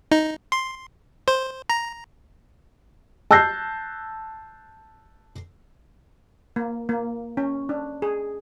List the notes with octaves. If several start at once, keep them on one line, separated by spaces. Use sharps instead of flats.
D#4
C6
C5
A#5
A5 E6 F#6 G6 A#6 C7
A#3
A#3
C#4
D4
G#4